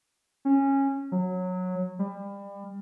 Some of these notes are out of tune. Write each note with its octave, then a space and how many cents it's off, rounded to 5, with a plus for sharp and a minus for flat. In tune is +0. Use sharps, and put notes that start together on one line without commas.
C#4 -15
F#3 -15
G3 +30